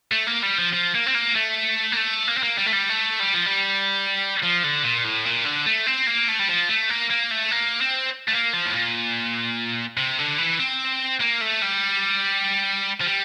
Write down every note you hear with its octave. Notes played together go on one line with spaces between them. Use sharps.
A3
A#3
G3
F3
F3
A#3
C4
A#3
A3
A#3
A3
A#3
C4
A#3
G3
A3
G3
A3
G3
F3
G3
F3
D3
A#2
A2
A#2
D3
A3
C4
A#3
A3
G3
F3
A3
A#3
A#3
A3
A#3
C4
A3
A#3
F3
A2
A#2
C3
D3
E3
C4
A#3
A3
G3
F3
G3